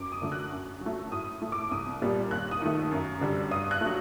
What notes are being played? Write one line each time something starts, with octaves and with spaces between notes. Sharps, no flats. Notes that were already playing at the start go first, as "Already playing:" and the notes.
Already playing: F#2 D6
D#6
D3 F#3 A3
F#6
F#2
F#3 A3
A2 D#6
A3
D6
C2 D#6
A#2 G3
D#2 F#6
D#6
D#3 A3
F#2
D3 G3
G2 D#6
F#6
F#3 A3